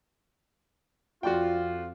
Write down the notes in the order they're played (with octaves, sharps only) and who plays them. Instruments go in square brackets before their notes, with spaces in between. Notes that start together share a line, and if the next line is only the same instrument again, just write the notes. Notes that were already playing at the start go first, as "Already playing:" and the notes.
[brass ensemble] F2 F4 [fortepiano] F#4 D5 G5